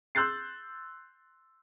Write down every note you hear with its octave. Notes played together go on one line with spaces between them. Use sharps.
C6 E6 F#6 G6 A6 C7